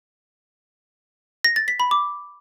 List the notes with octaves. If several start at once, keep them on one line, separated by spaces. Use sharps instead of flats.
A#6
A6
B6
B5
D6